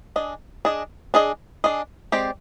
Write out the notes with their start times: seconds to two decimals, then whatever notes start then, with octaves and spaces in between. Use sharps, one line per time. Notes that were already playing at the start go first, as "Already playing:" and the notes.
0.16 D4 G#4 D#5
0.65 D4 G#4 D#5
1.14 D4 G#4 D#5
1.64 D4 G#4 D#5
2.12 G#3 C4 G4 D5